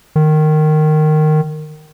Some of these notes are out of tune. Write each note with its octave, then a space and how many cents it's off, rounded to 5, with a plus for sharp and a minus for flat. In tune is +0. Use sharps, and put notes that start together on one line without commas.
D#3 -15